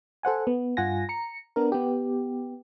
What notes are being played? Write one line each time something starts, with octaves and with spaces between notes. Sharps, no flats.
A4 C5 F#5 G#5
B3
G2 F4 F#5 G#5 A#6
A#5 C#7
B3 D4 A#4
B3 G4